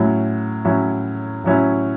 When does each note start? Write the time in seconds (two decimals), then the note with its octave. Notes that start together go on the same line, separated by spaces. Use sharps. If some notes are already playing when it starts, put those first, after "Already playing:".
Already playing: A2 F#3 C#4 E4
0.65 A2 F#3 C#4 E4
1.44 A2 F#3 C#4 E4